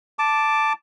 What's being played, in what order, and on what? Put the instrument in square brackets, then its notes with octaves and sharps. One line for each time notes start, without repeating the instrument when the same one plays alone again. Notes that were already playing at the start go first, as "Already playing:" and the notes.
[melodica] A5 D6